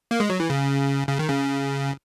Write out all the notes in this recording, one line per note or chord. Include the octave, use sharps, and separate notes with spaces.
A#3
G#3
F#3
E3
C#3
C#3
D#3
C#3